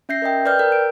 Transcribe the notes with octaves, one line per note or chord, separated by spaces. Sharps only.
C#4 E5 G6 A#6 C7
A#4 D#5 G5
B4 D5 G5 F6 G6
A#4
D7